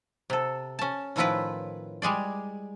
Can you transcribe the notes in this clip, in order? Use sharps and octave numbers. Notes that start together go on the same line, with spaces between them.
C3 A4
C#4 A5
A2 D#3 F3 E4 F4 B4
G3 G#3 G#4 D5